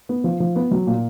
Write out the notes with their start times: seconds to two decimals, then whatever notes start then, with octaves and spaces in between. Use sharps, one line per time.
0.09 B3
0.24 F3
0.40 F3
0.56 B3
0.71 F#3
0.87 A#2